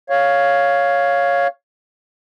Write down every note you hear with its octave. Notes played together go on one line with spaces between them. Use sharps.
C#5 F5